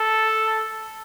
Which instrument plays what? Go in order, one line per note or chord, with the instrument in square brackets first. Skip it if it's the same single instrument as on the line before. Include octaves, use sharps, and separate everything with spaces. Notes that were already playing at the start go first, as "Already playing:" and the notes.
Already playing: [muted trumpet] A4